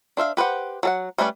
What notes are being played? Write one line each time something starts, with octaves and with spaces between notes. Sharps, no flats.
D4 C5 E5 F5
G4 B4 C5 F#5
F#3 A4 F#5
G3 A3 C#4 B4 D5